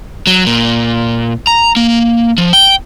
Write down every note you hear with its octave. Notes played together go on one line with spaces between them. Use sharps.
F#3
A#2
A#5
A#3
F3
G5